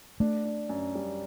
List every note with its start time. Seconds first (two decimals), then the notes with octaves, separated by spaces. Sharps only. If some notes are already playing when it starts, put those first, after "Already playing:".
0.20 A3 D4
0.45 D4
0.69 F#2
0.95 G3